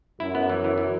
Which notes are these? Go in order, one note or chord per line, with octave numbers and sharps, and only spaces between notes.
F#2 E4
B3
E3
E3
E3